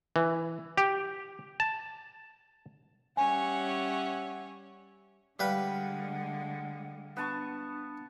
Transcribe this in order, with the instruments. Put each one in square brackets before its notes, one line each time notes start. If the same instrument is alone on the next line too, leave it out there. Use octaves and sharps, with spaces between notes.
[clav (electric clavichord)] E3
G4
A5
[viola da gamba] G3 C#4 C#5 [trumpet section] E5 F#5 [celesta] G#5
[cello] D3 G#3 [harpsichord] G3 B4 [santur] F5 [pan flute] F#5
[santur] B3 A5 C#6 [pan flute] D4